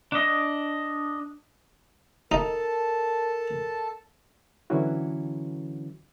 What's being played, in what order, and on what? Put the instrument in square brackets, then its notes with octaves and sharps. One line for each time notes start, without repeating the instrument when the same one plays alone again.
[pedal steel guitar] D4 D#5
[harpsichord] D#4 [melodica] A4 A5 [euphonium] A#4
[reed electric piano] D3 E3 F#3 C#4 E4 F#4